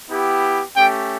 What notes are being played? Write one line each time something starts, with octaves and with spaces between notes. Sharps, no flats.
B3 E4 G4
A3 C#4 G4 G5